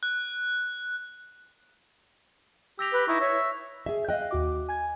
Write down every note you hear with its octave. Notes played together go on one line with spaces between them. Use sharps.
F#6
G4 E6 A#6 F7
B4
D#4 E4 C#6
C#5 E5
G#4 E5
D#5 F5 G5 F#6
D#2 F#4 D6
G#5 G#6